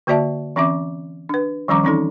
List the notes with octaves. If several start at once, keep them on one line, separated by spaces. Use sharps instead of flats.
D3 A#3 F#4 D5 E5 A5
E3 C4 C#4 E5 D6
D4 B4
D#3 F3 G3 C#4 A#5 D6
E3 C4 C#4 D#4 A4